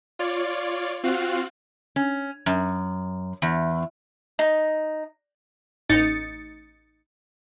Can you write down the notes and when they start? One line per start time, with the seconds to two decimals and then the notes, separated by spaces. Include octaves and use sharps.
0.19 F4 C#5 D5
1.03 C4 F4 F#4 F5 F#6
1.96 C#4
2.46 F#2
3.42 E2
4.39 D#4
5.89 A1 D#4 A6 C#7